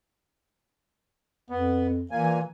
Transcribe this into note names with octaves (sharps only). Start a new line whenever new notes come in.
F2 B3
A#2 E3 A#3 G#5